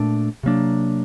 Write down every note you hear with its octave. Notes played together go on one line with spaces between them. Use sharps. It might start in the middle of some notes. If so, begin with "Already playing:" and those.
Already playing: A#2 A3 D4
C3 F#3 A#3 D4